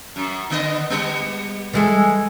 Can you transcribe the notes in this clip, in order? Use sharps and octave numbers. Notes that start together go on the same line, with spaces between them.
F#2
D3 B3 D#5
G3 B3
E3 G#3 A4